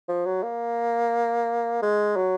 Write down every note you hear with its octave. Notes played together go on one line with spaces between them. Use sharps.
F3
F#3
A#3
G#3
F#3